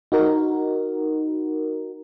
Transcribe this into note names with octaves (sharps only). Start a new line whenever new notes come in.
D#4 F#4 A#4